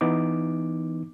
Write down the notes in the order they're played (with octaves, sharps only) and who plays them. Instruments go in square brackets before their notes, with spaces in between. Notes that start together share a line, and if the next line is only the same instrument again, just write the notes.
[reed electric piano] E3 B3 D#4 D6